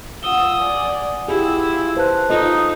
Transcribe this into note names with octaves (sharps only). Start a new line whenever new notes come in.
F4 F#5 D#6 E6 G7
D5 G#5
E4 F4 G4 G#4 E6
B4 C5 A5 F#6
D#4 F4 A4 D#5 F5